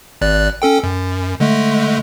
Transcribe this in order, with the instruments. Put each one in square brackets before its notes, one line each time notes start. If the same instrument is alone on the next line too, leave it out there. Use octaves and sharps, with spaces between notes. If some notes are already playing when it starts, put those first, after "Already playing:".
[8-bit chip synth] G#1 D5 F#6
C#4 A4 G5
F#2
D3 G#3 A3